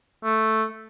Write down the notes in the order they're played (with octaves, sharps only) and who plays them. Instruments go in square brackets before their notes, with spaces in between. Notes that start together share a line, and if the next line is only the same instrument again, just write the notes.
[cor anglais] A3